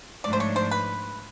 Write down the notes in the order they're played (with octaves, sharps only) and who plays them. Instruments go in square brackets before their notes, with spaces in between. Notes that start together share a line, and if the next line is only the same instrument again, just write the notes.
[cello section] G#2 F3 A3 D4 [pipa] D5
[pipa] C5
C#5
C5
B4